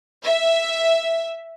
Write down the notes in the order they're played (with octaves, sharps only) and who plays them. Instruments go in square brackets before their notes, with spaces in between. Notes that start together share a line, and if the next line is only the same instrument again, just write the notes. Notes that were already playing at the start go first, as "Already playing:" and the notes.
[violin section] E5